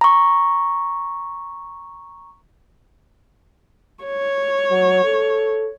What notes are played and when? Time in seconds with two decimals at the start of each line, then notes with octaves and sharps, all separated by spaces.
0.01 A#5 C#6
4.04 C#5
4.71 F#3
5.04 A4